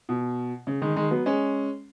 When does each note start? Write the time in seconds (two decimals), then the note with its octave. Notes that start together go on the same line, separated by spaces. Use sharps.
0.09 B2
0.67 C#3
0.82 D#3 G#3
0.96 D#3 G#3
1.11 F#3 B3
1.26 G#3 C#4